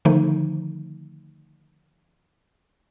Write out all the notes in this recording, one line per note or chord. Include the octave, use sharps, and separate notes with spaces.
D3 D#3 F3 A3 D#4